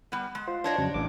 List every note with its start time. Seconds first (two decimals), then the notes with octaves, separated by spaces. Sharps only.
0.12 G3 B3
0.35 G#3
0.48 F4 C5
0.64 D4 C#5 D#5
0.78 F2 C#3 F#3
0.94 A1 D6